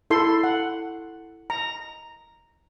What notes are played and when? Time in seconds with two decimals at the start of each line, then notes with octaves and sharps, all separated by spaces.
0.10 E4 A4 C6
0.44 F#5
1.50 A#5